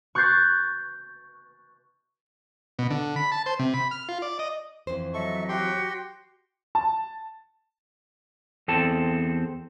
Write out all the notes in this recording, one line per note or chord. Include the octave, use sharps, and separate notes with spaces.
C#6 F#6 G6 A6 C7
B2
D3
B5
A5
C5
C3
B5
F6
F4
D5
D#5
F2 E3 C5
F#3 A4 D#5 E5 C#6
F#4 G4 G5 C6
A5
E2 C4 A4 A5